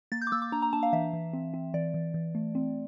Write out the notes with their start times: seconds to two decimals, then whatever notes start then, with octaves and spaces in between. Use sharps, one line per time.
0.12 A#3 A6
0.22 G6
0.27 D6
0.32 A#3 E6
0.42 D6
0.52 D4 A#5
0.62 A#5
0.73 D4 A5
0.83 F5
0.93 E3 E5
1.13 E3
1.33 C4
1.54 C4
1.74 E3 D5
1.94 E3
2.14 E3
2.35 A3
2.55 C4